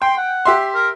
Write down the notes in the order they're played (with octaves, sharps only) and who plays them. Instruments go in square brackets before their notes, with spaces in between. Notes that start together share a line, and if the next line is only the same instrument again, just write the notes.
[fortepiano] G5 [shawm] C6
[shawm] F#5
[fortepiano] G4 E5 C6
[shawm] A#4